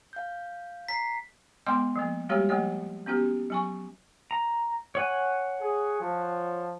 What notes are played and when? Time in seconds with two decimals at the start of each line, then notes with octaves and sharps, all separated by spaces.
0.13 F5 G6
0.88 A#5 B6 C7
1.66 G#3 B3 D#5 G5 C6 D6
1.96 F3 A#3
2.29 G3 G#3 A#3 F#4 G4 C#5
2.49 F3 A3 A#3 C#5
3.06 B3 C#4 F#4 G4
3.50 F#3 G#5 C#6
4.31 A#5
4.95 C#5 F#5 G#5
5.61 G#4
6.00 F3